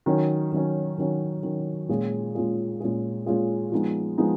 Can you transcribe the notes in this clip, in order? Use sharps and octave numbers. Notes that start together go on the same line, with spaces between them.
D#3 F#3 C#4
D#3 F#3 C#4
D#3 F#3 C#4
D#3 F#3 C#4
A#2 G#3 C#4 F4 G#4
A#2 G#3 C#4 F4 G#4
A#2 G#3 C#4 F4 G#4
A#2 G#3 C#4 F4 G#4
F3 G#3 B3 D#4
F3 G#3 B3 D#4